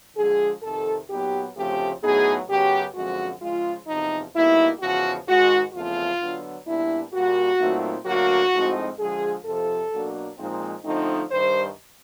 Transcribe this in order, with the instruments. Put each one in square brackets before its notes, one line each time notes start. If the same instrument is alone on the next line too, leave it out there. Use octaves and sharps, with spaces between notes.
[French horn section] D3 F3 G#3 G#4
F2 C3 D#3 A4
A#2 F#3 B3 D#4 G4
D2 C#3 F3 A3 C4 G4
A2 F#3 B3 D#4 G#4
F#2 C#3 F#3 B3 G4
F#2 D3 F3 G#3 C4 F#4
C#3 F3 G#3 F4
E2 C3 F3 D#4
B2 G3 A#3 D#4 E4
E2 C#3 F3 F#4
G#2 D#3 G#3 F#4
E2 C#3 F3 A3 C4 F4
D3 F#3 B3 D4
A#2 G3 B3 D4 E4
A#2 G3 A#3 F#4
A#2 F#3 A3 C4 D#4
D2 D3 F#3 A#3 F#4
A2 F3 G#3 C4 D#4
D3 F3 G#3 G#4
F2 C3 F3 A4
B2 F#3 A#3 D4
A#2 F3 G#3 C4 D#4
D3 F3 A3 C4 D#4
G2 D#3 G3 C5